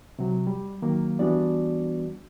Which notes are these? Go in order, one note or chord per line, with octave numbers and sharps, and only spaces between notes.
C3 F#3
G3
D#3 F#3 A#3
E3 G3 B3 D4 F#4 D5